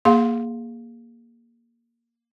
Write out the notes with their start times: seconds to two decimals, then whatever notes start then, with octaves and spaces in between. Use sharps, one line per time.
0.05 A#3 G#4 F5 C6